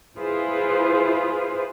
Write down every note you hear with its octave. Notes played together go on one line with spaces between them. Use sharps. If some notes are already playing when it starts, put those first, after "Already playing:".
E4 F4 G#4 B4 C5